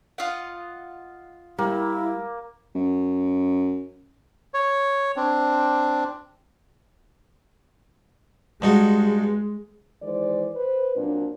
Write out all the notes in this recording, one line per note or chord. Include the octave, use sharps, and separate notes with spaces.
F4 D#5 F#5
G3 A#3 E4
F#2
C#5
C4 D4
G2 G#3 D#4 F#4
D#3 E3 G#3 C5 D5
B4 C5
A#2 F#3 C4 D4